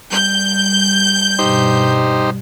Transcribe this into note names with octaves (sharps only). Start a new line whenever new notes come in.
G3 G6
G2 B2 D#4 G4 C5